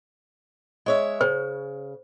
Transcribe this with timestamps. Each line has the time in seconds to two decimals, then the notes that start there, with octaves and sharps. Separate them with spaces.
0.86 G#3 C#5 E5
1.21 C#3 C5